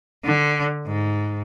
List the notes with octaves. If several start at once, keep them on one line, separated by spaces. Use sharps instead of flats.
D3
G#2